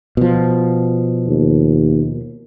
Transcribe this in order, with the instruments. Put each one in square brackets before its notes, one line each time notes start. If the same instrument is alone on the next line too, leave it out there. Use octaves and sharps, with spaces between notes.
[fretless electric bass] B2 F3
[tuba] D#2